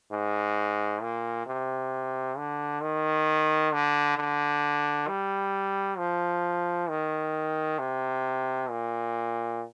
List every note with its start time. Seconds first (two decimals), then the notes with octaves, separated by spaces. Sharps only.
0.11 G#2
1.02 A#2
1.46 C3
2.38 D3
2.82 D#3
3.73 D3
4.17 D3
5.08 G3
5.98 F3
6.89 D#3
7.79 C3
8.70 A#2